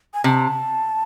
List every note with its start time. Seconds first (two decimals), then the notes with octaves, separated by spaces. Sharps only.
0.14 G#5
0.24 C3 A5